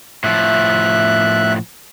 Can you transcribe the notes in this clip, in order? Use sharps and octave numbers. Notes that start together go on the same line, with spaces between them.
A2 F3 E5 F#6